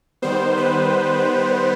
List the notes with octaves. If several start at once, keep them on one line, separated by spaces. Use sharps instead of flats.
D#3 G3 B3 C5
B4